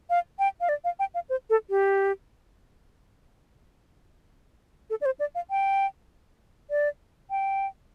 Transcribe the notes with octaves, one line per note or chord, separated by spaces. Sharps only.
F5
G5
F5
D5
F5
G5
F5
C5
A4
G4
A4
D5
C5
D5
F5
G5
D5
G5